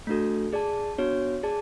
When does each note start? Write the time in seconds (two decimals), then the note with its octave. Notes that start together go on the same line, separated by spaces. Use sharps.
0.07 A3 D4 F#4 A4
0.53 G#4 D5 A5
0.98 B3 D4 F#4 C#5
1.43 G#4 D5 A5